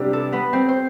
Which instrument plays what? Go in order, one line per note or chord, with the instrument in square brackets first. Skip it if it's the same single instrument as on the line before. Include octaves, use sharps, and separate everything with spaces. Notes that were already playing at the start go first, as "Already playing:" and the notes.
Already playing: [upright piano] C3 G3 D4 [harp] B3 G4 B4
[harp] A4
B3 B4
C4 C5
C5